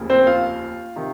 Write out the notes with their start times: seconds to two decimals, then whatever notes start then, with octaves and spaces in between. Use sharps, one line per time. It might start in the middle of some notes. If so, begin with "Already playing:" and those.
Already playing: F1 D#2 C#3 F3 A#3
0.10 C4 C5
0.27 F4 F5
0.96 C3 D#3